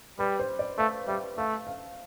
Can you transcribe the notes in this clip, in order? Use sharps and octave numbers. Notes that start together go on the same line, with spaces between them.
G3 B4
C5
D5
A3 F5
G3 E5
A3 F5
F5